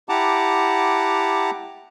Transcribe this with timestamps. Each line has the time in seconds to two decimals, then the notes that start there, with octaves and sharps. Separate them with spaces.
0.09 E4 G4 F#5 A5 A#5 D6